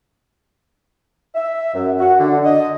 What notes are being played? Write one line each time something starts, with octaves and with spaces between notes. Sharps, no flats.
E5
F#2
F#4
D3
D#5